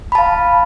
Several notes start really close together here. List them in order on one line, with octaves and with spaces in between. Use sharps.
B5 A5 F5